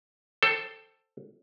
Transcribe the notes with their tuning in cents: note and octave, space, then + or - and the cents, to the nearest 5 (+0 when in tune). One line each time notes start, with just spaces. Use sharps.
A4 +10 C5 +10 G5 +0